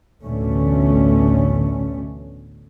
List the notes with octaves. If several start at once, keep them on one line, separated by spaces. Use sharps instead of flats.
A1 D2 B2 D3 A3 C#4